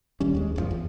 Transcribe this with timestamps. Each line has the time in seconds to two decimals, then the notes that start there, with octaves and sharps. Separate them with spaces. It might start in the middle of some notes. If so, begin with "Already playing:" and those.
0.20 D1 D#2 G3 C#4
0.34 D#2 G#3
0.56 F#1 C3 F3
0.71 E2